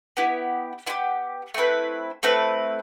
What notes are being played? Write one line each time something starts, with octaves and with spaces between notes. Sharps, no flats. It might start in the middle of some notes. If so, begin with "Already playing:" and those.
B3 E4 G4
B3 E4 G4
A3 C4 E4 B4
A3 C4 E4 B4